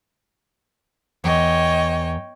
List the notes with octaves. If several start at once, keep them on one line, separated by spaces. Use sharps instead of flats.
E2 C#5 D#5 G5